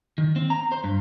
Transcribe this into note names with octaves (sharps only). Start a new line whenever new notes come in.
D#3
C4
A#5
C5
G2